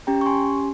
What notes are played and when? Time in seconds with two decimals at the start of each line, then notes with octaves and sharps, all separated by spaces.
0.07 C#4 G4 G5 A#5
0.21 C#6
0.26 G#5 C6